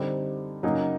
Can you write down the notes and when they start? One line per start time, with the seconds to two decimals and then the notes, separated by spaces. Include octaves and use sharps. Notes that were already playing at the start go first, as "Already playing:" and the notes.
Already playing: D3 G3 C4 D#4
0.63 C#3 F#3 A#3 D#4